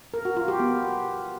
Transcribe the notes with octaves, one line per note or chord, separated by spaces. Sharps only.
A#4
F#4
F4
G4
B3